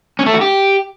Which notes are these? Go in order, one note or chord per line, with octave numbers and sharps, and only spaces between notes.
C#4
A3
F#4
G4